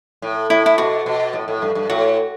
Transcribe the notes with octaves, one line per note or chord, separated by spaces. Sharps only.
A2
A2 E4
E4
B2 F#4
B2
A2
A2
G2
G2
A2 F#4